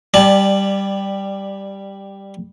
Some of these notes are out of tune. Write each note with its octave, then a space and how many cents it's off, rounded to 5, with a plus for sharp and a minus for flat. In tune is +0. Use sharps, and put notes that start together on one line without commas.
G3 +0 D5 +20 A5 -45